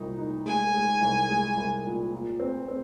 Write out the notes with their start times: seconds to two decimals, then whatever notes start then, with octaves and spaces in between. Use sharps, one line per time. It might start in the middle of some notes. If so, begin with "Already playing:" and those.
Already playing: C2 A#2 D#4
0.18 D#4
0.46 G#3 G#5
0.74 G#3
1.01 C2
1.29 G#3
1.57 C2
1.85 A#2
2.12 A#2
2.40 C4
2.68 C4